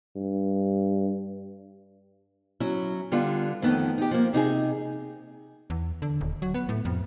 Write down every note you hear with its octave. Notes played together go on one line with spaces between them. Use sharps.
G2
F#3 C#4 E4
D3 G3 B3 F4
F2 D#3 A3 B3
D#4 G4
F3 A#3
C3 D#4 F4 G#4
E2
D3
D#1
F#3
B3
A2
F2